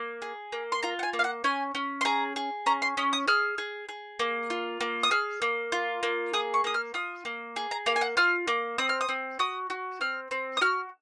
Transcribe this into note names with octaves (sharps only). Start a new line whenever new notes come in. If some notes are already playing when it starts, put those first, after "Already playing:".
Already playing: A#3
G#4
A#3
C6
F4 A#5
F#5
G#5
A#3
F5
F#5
C#4 G#5
C#4
C6
G#4 A#5
G#4
C#4 A#5
C6
C#4 D#6
D#6
G#4 F6
G#4
G#4
A#3
F4
A#3
D#6
G#4 F6
A#3
F4
A#3
G#4 D#6
C#6
A#3 D#6
F6
F4 D#6
A#3
G#4
A#5
A#3 F5
G#5
F#5
F4 F6
A#3
C4 D#6
F6
D#6
C4
F#4 D#6
F#4
C4 F6
C4
D#6
F#4 F6